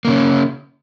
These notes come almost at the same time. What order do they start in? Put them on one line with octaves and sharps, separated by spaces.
A#3 C#3 C#4